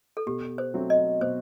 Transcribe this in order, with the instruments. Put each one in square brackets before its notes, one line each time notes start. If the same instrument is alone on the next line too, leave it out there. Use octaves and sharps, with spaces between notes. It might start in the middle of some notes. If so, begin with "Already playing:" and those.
[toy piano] A4
[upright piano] B2 [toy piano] G4
[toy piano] C5
[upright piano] F#3 A3 C4 F#4
[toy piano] D#5
[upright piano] B2 [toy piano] C5